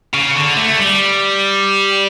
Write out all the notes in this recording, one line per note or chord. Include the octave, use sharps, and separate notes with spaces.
C#3
D3
A3
G3